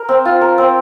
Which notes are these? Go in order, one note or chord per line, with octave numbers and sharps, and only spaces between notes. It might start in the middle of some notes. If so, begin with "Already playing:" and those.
Already playing: A#4
C4
F4
A#4
C4